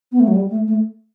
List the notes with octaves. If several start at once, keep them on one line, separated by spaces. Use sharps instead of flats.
B3
A3
F#3
G3
A3
A3